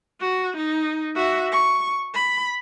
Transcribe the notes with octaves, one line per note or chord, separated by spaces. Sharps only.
F#4
D#4
F#4 E5
C#6
B5